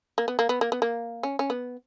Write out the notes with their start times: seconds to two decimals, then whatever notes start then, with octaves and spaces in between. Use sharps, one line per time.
0.18 A#3
0.28 B3
0.39 A#3
0.49 B3
0.61 A#3
0.72 B3
0.82 A#3
1.23 C#4
1.39 C#4
1.50 B3